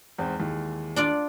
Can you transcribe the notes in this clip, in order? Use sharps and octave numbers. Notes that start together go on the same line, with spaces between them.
E2 G#2 C4
D#2 E3 G#3
D4 F4 D5